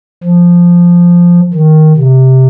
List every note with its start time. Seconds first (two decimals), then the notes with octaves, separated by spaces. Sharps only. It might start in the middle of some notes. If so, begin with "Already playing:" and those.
0.24 F3
1.54 D#3
1.97 C3